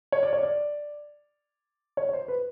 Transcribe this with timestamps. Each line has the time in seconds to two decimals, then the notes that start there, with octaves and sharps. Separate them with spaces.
0.12 C#5
0.23 D5
0.33 C#5
0.43 D5
1.97 C#5
2.09 C#5
2.13 C5
2.28 B4